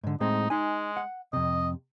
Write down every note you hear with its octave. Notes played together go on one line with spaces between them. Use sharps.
G#2 D3
A2 G#3 C4 D#4
G#3 D#4 G#5
F#5
F2 C3 D#5